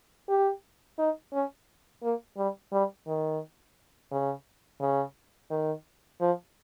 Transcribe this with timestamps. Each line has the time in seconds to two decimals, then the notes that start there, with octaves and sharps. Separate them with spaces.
0.29 G4
0.99 D#4
1.33 C#4
2.03 A#3
2.37 G3
2.72 G3
3.07 D#3
4.11 C#3
4.81 C#3
5.51 D#3
6.21 F3